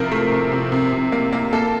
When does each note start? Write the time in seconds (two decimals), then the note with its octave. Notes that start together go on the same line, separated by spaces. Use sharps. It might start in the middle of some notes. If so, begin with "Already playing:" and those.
Already playing: C3 F3 A#4
0.12 A3
0.32 C3
0.52 C3
0.72 C3
0.92 C3
1.12 A#3
1.33 A#3
1.53 A#3 A4